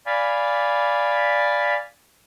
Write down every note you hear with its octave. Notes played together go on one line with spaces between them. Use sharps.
D5 F5 G#5 B5